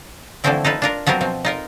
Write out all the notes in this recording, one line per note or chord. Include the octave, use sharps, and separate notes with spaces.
D3 E3 F3 A3 C4 E4
D#4 F4 A4 B4
D4 F4 A#4
F3 F#3 B3 C4 A#4
B2 F3 C4
D#4 F4 A#4